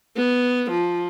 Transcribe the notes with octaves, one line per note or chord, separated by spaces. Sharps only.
B3
F3